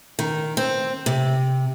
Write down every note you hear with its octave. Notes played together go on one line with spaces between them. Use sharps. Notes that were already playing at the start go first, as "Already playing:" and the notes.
D#3
C4
C3